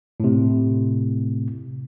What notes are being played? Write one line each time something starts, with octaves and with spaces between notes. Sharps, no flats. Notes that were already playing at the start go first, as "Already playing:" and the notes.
A2 C3